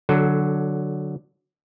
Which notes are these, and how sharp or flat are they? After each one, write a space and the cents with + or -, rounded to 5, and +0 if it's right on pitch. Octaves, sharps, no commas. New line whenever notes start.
D3 +0 F#3 +0 A4 -25